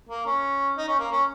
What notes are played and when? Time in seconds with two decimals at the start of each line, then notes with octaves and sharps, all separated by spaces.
0.09 A#3
0.26 C#4
0.77 D#4
0.88 C#4
0.99 A#3
1.12 C#4